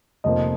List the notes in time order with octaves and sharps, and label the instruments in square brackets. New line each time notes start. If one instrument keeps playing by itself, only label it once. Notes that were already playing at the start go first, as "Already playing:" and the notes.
[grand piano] F1 F2 F3 A#3 D#5